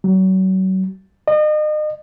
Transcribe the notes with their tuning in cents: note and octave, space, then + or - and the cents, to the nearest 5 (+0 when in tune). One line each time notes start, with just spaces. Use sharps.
F#3 +35
D#5 -35